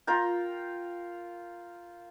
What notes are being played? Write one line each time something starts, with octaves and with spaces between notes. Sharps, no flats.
F4 A#4 G5